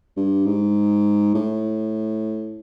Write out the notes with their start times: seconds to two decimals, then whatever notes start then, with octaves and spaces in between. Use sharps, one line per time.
0.17 G2
0.46 G#2
1.35 A2